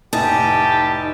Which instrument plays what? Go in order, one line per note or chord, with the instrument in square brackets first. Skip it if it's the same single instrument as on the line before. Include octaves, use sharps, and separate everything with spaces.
[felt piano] F1 A2 G#5 [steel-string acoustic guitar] D#4 [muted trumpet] G4 [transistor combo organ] A5